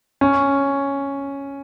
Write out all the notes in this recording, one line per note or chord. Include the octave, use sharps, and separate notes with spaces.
C#4